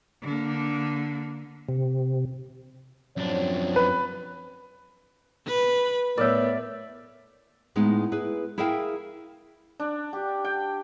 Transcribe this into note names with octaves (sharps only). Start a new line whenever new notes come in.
D3 A#3
C3
F#2 F3 C4 D4 C#5
B4
B4
A2 B3 A#4 B4 C#5 D5 E5
A2 G#3 B3 D#4
E4 G#4 B4
E4 G#4 A#4 E5 F5 G5
D4
G4
G5